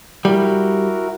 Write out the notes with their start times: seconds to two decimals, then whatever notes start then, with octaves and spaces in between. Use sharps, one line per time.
0.25 G3 E4 F#4 A#4